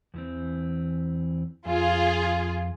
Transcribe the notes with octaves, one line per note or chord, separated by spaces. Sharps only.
E2 E3 C4
F2 F4 G#4